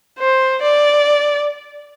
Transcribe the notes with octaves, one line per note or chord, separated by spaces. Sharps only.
C5
D5